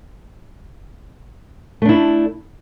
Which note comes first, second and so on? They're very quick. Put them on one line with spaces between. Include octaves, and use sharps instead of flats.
A3 D4 E4